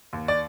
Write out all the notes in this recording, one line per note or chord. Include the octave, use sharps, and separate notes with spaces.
D#2
D5